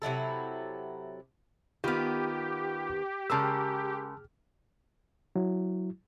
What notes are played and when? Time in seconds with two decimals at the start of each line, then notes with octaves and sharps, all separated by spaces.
0.02 C3 F#3 E4 A4
1.84 D#3 B3 F4 G4 B5 F6
3.30 C#3 G#3 G#4 A#4 A5 E6 F6
5.36 F#3 E4